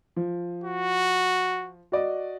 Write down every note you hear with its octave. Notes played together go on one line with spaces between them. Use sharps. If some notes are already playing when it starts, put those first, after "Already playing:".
F3
F#4
F#4 D5 D#5